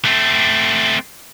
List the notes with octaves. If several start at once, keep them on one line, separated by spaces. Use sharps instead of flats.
A3 C4